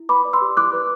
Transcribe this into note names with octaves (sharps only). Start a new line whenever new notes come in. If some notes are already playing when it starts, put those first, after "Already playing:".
Already playing: E4
B4 B5 D6
D5
C6 E6
G4
E4 D6 F#6
B4